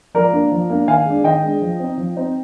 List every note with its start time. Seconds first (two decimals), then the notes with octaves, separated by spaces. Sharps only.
0.14 F3 A#4 D5
0.32 A#3 D4
0.52 F3
0.70 A#3 D4
0.87 D#3 F5 G#5
1.06 G#3 D4
1.24 D#3 D#5 G5
1.43 G#3 D4
1.61 F3
1.79 C4 D#4
1.97 F3
2.16 C4 D#4